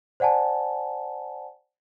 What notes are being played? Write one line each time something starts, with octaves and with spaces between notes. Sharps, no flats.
C5 D5 F#5 G#5 A5